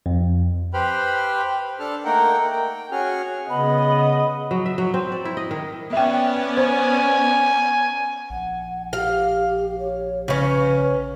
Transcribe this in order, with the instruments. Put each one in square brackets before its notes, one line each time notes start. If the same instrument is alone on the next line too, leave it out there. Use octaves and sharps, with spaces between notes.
[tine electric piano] F2
[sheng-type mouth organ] G4 B4 C5 G5 B5 F6
D4 A4 A5 F6
A3 A#3 D#4 A#4 F#5 G5
G5
C#4 F#4 G#4 F6
[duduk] C#3 [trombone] B3 [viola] D#5 [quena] B5
[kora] F#3
E5
F#3
C4
D5
E4
D#5
D#3
[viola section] B3 C#4 D5 [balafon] E5 G5
[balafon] C5 [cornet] G#5
[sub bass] A#1 [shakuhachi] F#5
[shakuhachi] G4 [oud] F5
[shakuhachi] C#5
[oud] C#3 C#4 [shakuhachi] B4